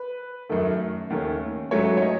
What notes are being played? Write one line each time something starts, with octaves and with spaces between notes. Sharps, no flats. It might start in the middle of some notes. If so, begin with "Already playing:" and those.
Already playing: B4
F#2 D#3 A3
D#2 D#3 A3 C#4
G#2 F#3 A3 C#4 C#5
C#5
D#5